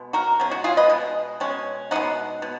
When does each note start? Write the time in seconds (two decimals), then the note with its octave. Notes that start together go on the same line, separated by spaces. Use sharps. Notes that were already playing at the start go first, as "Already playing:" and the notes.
Already playing: B2 G#3
0.13 F#4 A#4
0.40 B2 G#3 C#4
0.51 F#4
0.64 F4 G#4
0.77 B4 D#5
0.90 B2 G#3
1.40 B2 G#3 C#4
1.91 B2 G#3 D#4 D#5 F#5
2.42 B2